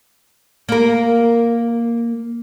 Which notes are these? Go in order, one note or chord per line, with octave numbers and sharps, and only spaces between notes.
A#3 A#4